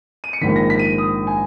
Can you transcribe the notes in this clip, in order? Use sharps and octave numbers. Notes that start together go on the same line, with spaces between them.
D#7
C#7
A#1 G#2 D#3 B6
A#6
B6
D#7
D#6
G#5